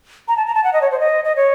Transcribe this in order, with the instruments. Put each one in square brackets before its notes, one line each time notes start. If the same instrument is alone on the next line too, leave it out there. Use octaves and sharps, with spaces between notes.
[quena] A#5
A5
A#5
A5
F#5
D#5
C#5
C5
D#5
D#5
C#5